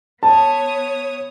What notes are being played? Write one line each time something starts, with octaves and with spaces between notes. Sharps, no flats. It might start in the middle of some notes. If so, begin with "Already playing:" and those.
B3 C#5 A5 D#6